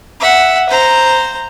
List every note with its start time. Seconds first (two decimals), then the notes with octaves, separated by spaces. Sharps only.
0.20 E5 F#5
0.70 C5 A#5